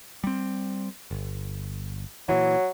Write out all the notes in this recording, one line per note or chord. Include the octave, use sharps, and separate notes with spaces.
G3 C4
G1
A#2 E3 F#3